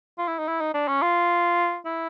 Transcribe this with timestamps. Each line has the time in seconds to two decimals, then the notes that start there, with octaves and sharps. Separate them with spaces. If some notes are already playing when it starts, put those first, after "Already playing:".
0.18 F4
0.28 E4
0.39 D#4
0.48 E4
0.61 D#4
0.74 D4
0.88 C#4
1.02 F4
1.85 E4